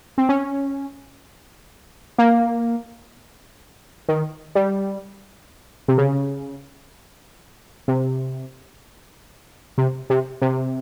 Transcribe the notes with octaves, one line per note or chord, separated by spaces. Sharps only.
C4
C#4
A#3
D#3
G3
C3
C#3
C3
C3
C3
C3